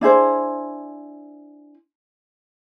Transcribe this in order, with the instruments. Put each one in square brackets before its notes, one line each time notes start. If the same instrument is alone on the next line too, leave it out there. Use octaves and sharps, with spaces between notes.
[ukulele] D4 E4 G#4 C5